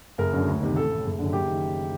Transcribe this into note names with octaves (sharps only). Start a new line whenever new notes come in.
F#1 A#4
F#2 D3
D2
C3 D#3
A1 A4
A2
F#1
F#2 D3
F#1 G4
D#3